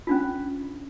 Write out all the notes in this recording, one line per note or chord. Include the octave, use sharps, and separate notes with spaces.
C#4 D4 F4